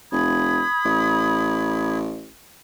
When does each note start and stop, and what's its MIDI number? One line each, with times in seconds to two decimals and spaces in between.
0.12 0.62 29
0.12 1.98 83
0.12 1.98 87
0.12 1.98 92
0.85 2.31 33